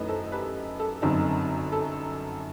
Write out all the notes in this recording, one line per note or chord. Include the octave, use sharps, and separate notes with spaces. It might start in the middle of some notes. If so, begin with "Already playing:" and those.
Already playing: F#2 D#3 A3 E4 B4 D#5
A4 C5
G4 B4
A4
G1 F#2 F#3 C4 D#4
A4